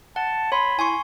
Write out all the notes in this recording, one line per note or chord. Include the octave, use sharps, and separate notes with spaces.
F#5 A5
C#5 B5 C6
E4 G#5 C6 C#6